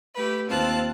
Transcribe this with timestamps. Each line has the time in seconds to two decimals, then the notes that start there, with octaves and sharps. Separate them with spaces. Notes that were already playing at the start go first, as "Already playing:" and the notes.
0.17 A3 G4 B4
0.49 D#2 C4 F4 A5 F#6